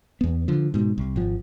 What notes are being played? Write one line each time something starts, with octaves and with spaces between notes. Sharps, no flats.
E2 B3
D3 F3
G#2 B2
C2
G#1 F3